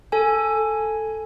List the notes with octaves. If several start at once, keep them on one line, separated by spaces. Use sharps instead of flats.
A4 G#5